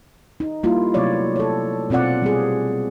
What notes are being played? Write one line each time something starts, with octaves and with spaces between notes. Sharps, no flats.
D#4
G3 A#3 E4 F4
C3 F#3 A3 B3 C#5 D5
A4 C#5
B2 C4 F4 D5 F#5
G3 B3 G#4